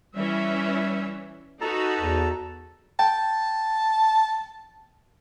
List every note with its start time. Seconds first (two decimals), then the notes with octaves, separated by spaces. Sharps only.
0.15 E3 G3 C#4 E5
1.61 D#4 F#4 A4 B4 A5 A#5
2.00 E2
2.99 G5 A5